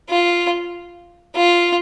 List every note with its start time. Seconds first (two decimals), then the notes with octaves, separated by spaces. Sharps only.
0.10 F4
1.36 F4